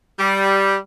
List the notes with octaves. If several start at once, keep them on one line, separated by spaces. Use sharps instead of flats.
G3